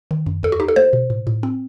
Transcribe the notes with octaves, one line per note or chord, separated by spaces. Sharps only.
D#3
F#2
E2 A4
F#4
D#4 G4
A4
A3 C5
B2
A2
A2
C4